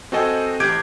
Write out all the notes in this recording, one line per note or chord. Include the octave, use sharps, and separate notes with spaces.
C4 F#4 A4 D#5 G5 G#5
A1 G4 D6 G6 G#6 D7